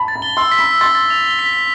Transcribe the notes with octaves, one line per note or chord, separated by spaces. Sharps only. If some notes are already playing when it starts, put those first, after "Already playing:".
Already playing: A5 B5
A6
B5
G7
C6 E6
B6
B5
E6
C6 A6
A6
F7
G7
B6
B6